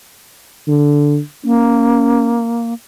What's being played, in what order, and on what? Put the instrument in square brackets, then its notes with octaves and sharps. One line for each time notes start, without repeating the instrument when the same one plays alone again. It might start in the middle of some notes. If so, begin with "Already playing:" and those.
[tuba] D3
[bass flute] A#3 [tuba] C#4